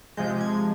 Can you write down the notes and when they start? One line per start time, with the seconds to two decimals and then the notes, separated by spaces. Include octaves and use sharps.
0.17 C3 F3 G#3 G6
0.41 G#6